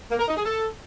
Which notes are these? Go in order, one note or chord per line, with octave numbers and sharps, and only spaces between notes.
A#3
A#4
D#4
G#4
A4